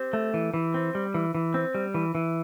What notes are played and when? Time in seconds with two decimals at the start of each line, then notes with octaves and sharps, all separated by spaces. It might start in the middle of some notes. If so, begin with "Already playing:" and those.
Already playing: C4 G4
0.13 A3
0.34 E3
0.54 E3
0.74 C4
0.95 G3
1.14 E3
1.35 E3
1.54 C4
1.75 G3
1.94 E3
2.15 E3